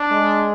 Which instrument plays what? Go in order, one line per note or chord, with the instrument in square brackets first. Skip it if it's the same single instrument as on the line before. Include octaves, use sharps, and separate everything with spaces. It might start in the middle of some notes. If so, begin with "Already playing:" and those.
Already playing: [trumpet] D4
[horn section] G#3